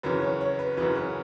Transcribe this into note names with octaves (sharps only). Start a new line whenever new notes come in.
F#2 C#3 E3 B4
C#5
C#5
B4
F#2 C#3 E3 B4
B4